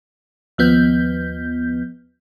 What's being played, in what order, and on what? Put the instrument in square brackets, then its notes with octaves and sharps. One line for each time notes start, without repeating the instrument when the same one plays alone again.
[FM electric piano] D#2 F3 B3 G6